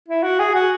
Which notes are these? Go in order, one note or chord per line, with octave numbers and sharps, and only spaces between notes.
E4
F#4
G#4
F#4